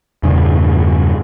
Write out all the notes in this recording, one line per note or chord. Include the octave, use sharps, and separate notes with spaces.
E2 G2 A#2 C#3